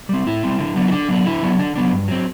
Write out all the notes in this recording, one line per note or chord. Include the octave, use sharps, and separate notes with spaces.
G3 C4
A2 E4
G3 C4
D3
F#3 B3 D4
E4
D3 D4
F#3 B3 D4
D3 E4
F#3 B3 D4
D3 D4
F#3 B3 D4
G2
F#3 C4